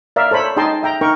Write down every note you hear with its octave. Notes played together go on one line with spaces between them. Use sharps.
A#4 D5 E5 F5
A4 C5 C#5 B5
D#4 G#4 D#5 G5 A5 C6
E5 G5 A#5
D#4 A#4 G5 C#6